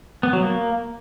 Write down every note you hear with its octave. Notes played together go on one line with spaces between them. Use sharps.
B3
F#3
A#3